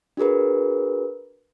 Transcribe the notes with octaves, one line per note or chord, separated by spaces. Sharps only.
D4 F#4 G#4 A#4 B4